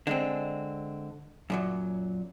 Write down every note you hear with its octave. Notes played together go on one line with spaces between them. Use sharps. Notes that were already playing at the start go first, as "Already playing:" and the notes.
D3 G#3 C4
F#2 A#2 F#3